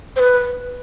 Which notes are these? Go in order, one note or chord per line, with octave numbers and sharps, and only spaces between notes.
C5
B4